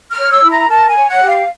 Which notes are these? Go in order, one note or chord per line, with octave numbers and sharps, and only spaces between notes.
F6
C#5
E6
E4
A#5
A#4 A5
G#5
C#5
F#5
G4
F5